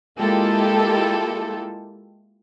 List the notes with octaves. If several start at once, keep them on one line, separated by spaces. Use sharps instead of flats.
G#3 A#3 E4 F4 G4 A4